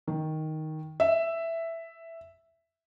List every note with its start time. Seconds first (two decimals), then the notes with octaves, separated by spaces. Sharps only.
0.08 D#3
1.00 E5